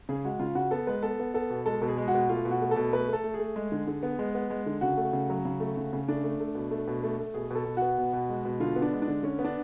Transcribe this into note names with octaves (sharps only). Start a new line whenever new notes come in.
C#3 G#4
G#3 F#4
C#3 F4
C#3 F#4
B3 A4
G#3 B4
B3 A4
B3
B3 A4
B2
G#3 A4
B2 A4
G#4
G#3
F#4
B2
A3 F4
B2
F#4
A3
A4
B2
A3 B4
A3
A4
A3
G#4
A3
G#3
D3
D3
B3
G#3
B3
G#3
D3
C#3 F#4
A3
C#3
F#3
C#3
A3
C#3
C#3
A3 D4
A3
A3
B2
A3
B2
A3
A3
B2 G#4
B2 A4
B2
F#4
B3
B2
B2
G#3
B2
D3 F4
B3
D4
G#3
D4
D3
D3 C#4
B3
D4